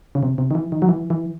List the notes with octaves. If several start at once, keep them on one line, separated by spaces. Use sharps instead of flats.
C#3
C3
C3
D#3
E3
D#3
F#3
E3
E3